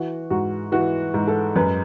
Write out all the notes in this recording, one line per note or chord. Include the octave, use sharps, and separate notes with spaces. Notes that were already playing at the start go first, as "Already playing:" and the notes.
Already playing: E3 F#4
G#2 F#4
E3 F#4
G#2
A4
F#2 B4